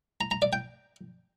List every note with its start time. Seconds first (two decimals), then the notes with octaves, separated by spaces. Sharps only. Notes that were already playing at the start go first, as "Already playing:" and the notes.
0.21 A#5
0.31 A#5
0.42 D5
0.53 G5